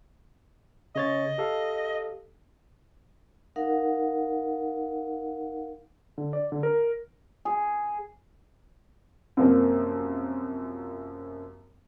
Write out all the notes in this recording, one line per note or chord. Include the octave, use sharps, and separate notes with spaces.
C#3 C#5 D#5 A6
G4 A4 F5
D#4 A#4 F5 F#5
D3
D5
D3
A#4
G#4
F#2 C3 F3 A#3 C4